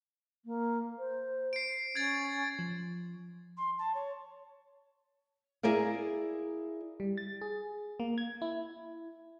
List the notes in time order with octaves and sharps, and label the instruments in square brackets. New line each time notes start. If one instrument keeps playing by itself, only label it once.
[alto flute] A#3
C5
[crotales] C7 D7
[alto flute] C#4 [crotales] G#6 A6
[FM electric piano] F3
[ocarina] C6
A5
C#5
[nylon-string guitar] E4 G#4 A#4 D5 F5
[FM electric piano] G3
A6
G#4
A#3
G#6
E4